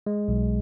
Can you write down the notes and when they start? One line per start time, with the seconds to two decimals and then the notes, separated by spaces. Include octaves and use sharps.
0.07 G#3
0.28 B1